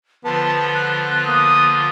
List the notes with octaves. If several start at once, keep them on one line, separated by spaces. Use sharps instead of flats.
D3 F3 B3 F4 A5
F#6
A#3 D#6